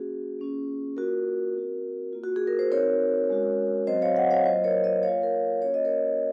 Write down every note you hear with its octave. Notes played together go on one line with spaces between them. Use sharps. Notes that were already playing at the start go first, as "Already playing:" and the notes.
Already playing: A#3 C#4 F#4 G#4
A#3 C#4 F4
A#3 F4 F#4 A#4
C4 F#4
A#3 F4
F#4
G#4
A#4
C5
C4 D#4 F#4 A#4 C#5
G#3 C#4 F#4
F#3 C4 F#4 C5 D#5
C#5 F5
D#5 F#5
C#5 F5
F#3 A#3 F4 C5 D#5
A#4 C#5
C5 D#5
A#3 F4 C#5 F5
A#4 C#5
A#3 C#4 F#4 C#5
D#5
A#4 C#5